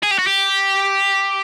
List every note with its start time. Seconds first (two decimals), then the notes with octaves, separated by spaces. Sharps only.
0.03 G#4
0.11 G4
0.19 F#4
0.27 G4